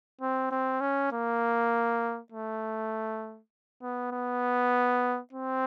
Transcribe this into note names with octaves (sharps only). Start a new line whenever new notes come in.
C4
C4
C#4
A#3
A3
B3
B3
C4